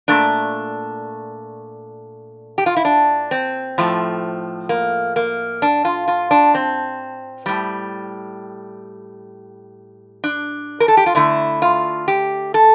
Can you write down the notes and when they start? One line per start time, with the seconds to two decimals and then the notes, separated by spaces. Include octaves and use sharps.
0.08 A#2 A3 D4
2.58 G4
2.66 F4
2.77 E4
2.85 D4
3.31 C4
3.78 A2 F3 A3
4.69 A#3
5.16 A#3
5.62 D4
5.85 F4
6.08 F4
6.31 D4
6.55 C4
7.46 A2 G3
10.24 D4
10.80 A#4
10.88 A4
10.97 G4
11.06 F4
11.15 D3 A3 E4
11.62 F4
12.08 G4
12.54 A4